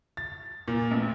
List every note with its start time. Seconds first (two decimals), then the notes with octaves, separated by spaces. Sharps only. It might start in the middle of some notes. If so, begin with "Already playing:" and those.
0.17 A6
0.68 A#2
0.91 A1